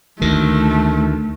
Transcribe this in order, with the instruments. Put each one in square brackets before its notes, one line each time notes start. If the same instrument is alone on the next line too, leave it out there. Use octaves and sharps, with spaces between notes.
[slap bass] D2 D#3 [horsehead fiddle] A3